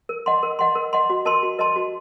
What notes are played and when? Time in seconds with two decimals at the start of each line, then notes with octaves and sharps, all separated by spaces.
0.09 A#4
0.26 D#5 F#5 C6
0.43 A#4
0.59 D#5 F#5 C6
0.75 A#4
0.93 D#5 F#5 C6
1.10 F#4
1.25 A#4 D#5 A5 C6
1.43 F#4
1.59 A#4 D#5 A5 C6
1.76 F#4